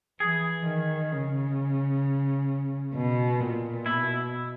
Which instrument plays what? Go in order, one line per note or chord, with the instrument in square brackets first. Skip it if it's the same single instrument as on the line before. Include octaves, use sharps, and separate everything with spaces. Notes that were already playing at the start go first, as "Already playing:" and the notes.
[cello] E3 [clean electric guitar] G#4
[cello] D#3
C#3
B2
A#2
[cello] B2 [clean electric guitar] E4